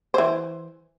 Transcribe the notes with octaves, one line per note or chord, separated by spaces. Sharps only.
E3 C5